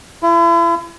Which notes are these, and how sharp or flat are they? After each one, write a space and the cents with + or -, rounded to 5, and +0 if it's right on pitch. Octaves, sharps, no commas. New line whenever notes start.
E4 +40